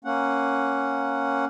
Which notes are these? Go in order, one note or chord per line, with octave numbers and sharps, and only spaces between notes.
A#3 C#4 F#5